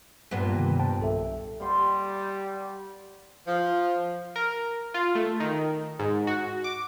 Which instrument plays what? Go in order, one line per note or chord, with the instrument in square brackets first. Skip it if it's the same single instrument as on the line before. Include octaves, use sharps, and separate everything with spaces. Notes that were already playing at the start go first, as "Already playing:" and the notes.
[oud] G2 A#2 B3
[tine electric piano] C3 D#3
C5 G5 A5
B1 A4 E5
[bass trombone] G3 [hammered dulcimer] F#5 C6
[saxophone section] F3
[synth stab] A#4
F4
A3
D#3
G#2
F#4
D6